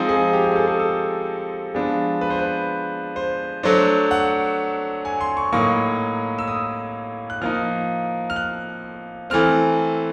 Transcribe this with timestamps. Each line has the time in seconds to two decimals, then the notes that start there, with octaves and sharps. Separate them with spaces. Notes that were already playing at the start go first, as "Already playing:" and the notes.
Already playing: F3 G#3 C4 D#4
0.09 G#4
0.33 G4
0.45 G4
0.52 G#4
0.56 A4
0.68 G#4
0.80 A4
1.74 F3 G#3 B3 D4
2.21 B4
2.30 C5
2.39 B4
3.16 C5
3.63 F#3 A3 D4 C5
4.11 F#5
5.05 G#5
5.21 C6
5.37 C#6
5.53 A2 F#3 A#3 D#4 C#6
6.38 E6
6.48 D#6
7.30 F#6
7.42 F3 A#3 D#4 F6
8.30 F6
8.36 F#6
9.30 E3 A3 C4 F6